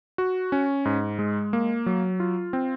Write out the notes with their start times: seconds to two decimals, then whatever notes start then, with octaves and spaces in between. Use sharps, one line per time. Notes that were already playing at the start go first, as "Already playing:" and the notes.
0.18 F#4
0.52 C#4
0.85 G#2
1.19 G#3
1.53 A#3
1.86 F#3
2.20 F4
2.53 C4